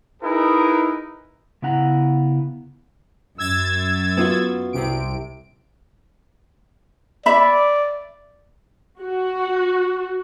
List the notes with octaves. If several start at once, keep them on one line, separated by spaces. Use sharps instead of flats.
D#4 E4 G#4 A#4 B4
C#3 B3 E4 F#5 A#5
F#2 E6 G#6 A6
B3 F4 F#4
C2 C3 D7
D5 E5 B5
F#4